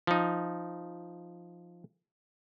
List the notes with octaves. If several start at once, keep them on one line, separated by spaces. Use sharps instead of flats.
F3 D#4